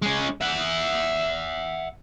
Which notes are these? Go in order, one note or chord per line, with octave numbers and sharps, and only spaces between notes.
G#3 C#4
E5 F#5